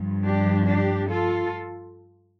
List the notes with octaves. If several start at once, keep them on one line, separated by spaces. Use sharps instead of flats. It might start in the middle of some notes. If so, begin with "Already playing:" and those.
Already playing: G2 F3
D4 G4
D4 G4
F4 A4